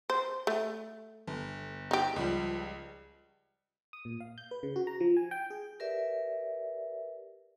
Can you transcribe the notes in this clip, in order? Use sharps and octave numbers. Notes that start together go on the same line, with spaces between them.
C5
A3
G1
D#4 G4
C#2 F3 G3
D#6
A#2
F5
G6
B4
C#3
F#4
A#5
F3
G#5
G5
G#4
G4 A#4 B4 D5 E5